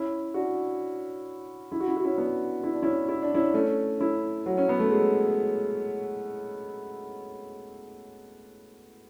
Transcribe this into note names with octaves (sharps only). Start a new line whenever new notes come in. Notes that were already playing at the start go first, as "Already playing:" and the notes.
Already playing: C#4 E4
D4 F#4
E4
F#4
E4
F#4
C#4 E4
B3 D4
E4
D4
C#4 E4
E4
D4
C#4 E4
A3 C#4
C#4 E4
F#3
C#4
B3
A3
G#3